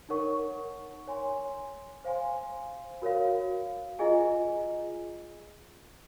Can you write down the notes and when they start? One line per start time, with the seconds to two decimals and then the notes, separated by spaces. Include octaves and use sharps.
0.09 D#4 A#4 C#5 F#5 C#6
1.07 C#5 G#5 C6
2.04 C5 F5 G#5 C6
3.02 F#4 A#4 C#5 F5
3.99 F4 G#4 D#5 G#5